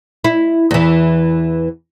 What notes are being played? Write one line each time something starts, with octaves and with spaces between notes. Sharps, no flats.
E4
E2 E3